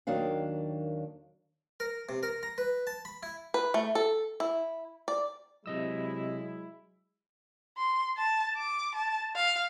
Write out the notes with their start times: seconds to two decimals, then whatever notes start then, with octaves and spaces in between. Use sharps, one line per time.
0.07 D#2 D#3 F#3 A#3 D4 F5
1.80 A#4
2.09 C3
2.23 A#4
2.43 A#5
2.58 B4
2.87 A5
3.05 B5
3.23 E4
3.54 B4
3.74 A3
3.95 A4
4.40 E4
5.08 D5
5.66 C3 F#3 G#3 E4 D#5 E6
7.78 C6
8.18 A5
8.57 D6
8.95 A5
9.36 F5